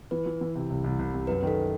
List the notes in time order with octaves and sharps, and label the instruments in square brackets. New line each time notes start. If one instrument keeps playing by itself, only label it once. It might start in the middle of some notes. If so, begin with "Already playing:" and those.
[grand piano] E3 [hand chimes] B4
[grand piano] E3
E3
C3
C2
C2
C2
C3
[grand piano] F#2 [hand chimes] B4
[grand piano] D#3 [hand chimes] A4